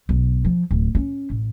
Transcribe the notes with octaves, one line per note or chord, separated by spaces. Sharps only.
B1
F3
D1
C#4
A1